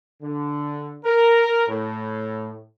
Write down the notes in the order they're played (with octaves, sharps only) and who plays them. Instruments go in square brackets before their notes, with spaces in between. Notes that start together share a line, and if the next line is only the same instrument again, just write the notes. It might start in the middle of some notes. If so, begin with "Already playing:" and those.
[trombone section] D3
A#4
A2